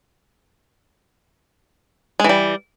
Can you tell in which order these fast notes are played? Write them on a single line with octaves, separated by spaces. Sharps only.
G#3 E3 G3